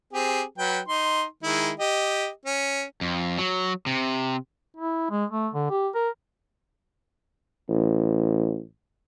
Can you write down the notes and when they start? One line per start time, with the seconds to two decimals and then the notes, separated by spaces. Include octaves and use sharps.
0.13 C4 G4 G#4
0.58 F#3 B4 G5
0.88 D#4 C6
1.43 D#3 G#3 E4
1.80 G4 D#5
2.46 C#4
3.01 F2
3.38 F#3
3.86 C3
4.76 E4
5.10 G#3
5.30 A3
5.53 D3
5.70 G4
5.95 A#4
7.69 A1